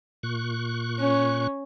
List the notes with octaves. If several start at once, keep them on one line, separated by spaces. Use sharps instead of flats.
A#2 C#6 F#6
C#4